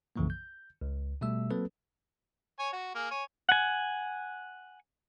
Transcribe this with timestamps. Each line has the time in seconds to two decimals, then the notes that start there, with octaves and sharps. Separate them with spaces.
0.16 B1 F#2 C#3 E3 F3 A#3
0.30 G6
0.81 C#2
1.21 B2 G3 A3 E5 E6
1.51 F#3 A#3 C4 A4 B4
2.59 C#5 G#5
2.73 F#4
2.95 A#3 G#4
3.11 C#5 G#5
3.49 F#5 G#5